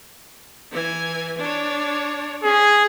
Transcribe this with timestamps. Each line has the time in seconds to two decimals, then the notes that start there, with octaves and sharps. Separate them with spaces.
0.72 E3 G#5
1.38 D4 C#5
2.43 C#4 G#4